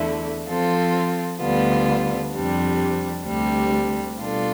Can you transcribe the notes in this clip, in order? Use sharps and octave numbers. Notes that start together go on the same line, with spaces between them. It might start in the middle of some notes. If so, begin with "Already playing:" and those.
Already playing: E2 D3 A3 E4
F3 C4 F4 A4
D2 D3 G3 B3 F4
F2 C3 G3 D4
D2 C3 G3 D4
B2 G3 D4 F4 A4